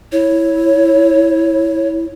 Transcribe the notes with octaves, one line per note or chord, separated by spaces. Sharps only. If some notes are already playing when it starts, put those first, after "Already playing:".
E4 C#5